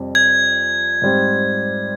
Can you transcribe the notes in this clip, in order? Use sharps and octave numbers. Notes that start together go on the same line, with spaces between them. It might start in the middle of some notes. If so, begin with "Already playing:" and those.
Already playing: F2 C3 G3 C4
G#6
G#2 G3 C4